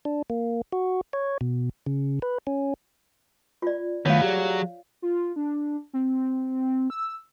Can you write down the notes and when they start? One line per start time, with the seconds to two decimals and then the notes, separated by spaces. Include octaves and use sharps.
0.05 D4
0.30 A#3
0.73 F#4
1.13 C#5
1.41 B2
1.86 C#3
2.22 B4
2.47 C#4
3.62 F4 D5
4.06 D#3 E3 F#3 A3 B3 C#5 F5
4.22 F#3 G4 G#4 D5
5.02 F4
5.36 D4
5.93 C4
6.90 E6